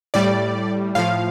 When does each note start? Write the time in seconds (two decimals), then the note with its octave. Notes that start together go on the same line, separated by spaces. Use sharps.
0.14 A2 G3 D5
0.95 A2 F3 F5